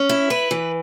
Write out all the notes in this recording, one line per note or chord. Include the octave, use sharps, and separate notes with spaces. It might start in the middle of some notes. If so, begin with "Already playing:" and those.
Already playing: C#4
E4
B4
E3